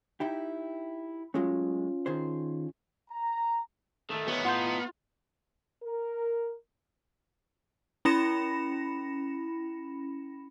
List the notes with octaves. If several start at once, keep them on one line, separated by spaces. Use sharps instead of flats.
D#4 E4 G4
F#3 G#3 A3 C#4 F4
D#3 G#4 C5
A#5
D#3 A3 A4
B3 G4 C#5
A2 D#4 F4 F#5 C6 G6
A#4
C#4 E4 B5 A#6 C#7 E7